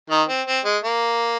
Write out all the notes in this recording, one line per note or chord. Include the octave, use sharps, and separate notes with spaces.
D#3 D#4
C4
C4
G#3
A#3